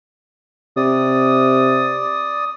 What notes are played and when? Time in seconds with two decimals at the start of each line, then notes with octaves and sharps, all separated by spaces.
0.77 C3 D5 D#6